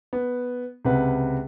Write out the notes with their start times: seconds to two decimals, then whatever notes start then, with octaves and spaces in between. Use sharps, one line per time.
0.13 B3
0.85 C#2 C3 B4 F#5